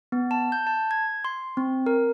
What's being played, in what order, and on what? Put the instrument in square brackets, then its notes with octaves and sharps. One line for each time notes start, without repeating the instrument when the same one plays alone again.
[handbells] B3
A5
G6
A5
G#6
C6
C4
A#4